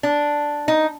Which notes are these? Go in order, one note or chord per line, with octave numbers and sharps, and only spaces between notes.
D4
D#4